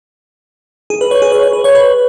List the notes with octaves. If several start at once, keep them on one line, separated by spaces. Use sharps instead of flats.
G#4
B4
C#5
G#4
C#5
C#5
B4
C#5
B4